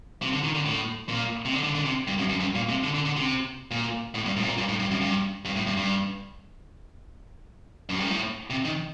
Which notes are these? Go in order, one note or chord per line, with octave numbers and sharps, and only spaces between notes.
C3
D3
D#3
D3
A2
A#2
C3
D3
D3
D3
C3
G2
F#2
F#2
G2
A#2
C3
D3
D3
D3
C3
A#2
A2
G2
A2
C3
A#2
G2
A2
G2
F#2
G2
G2
A2
G2
G2
F#2
G2
A2
C3
D#3